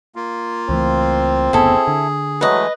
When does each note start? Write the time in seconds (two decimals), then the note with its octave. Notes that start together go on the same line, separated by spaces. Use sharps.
0.16 A#3 F4
0.69 C#2 E3 A3 C4
1.53 F#1 D2 B3 E4 G#4 A4
1.87 D3
2.41 E3 F#3 G#3 A3 B4 D#5